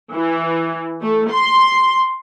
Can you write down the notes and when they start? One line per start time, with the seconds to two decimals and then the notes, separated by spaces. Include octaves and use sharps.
0.14 E3
1.02 A3
1.31 C6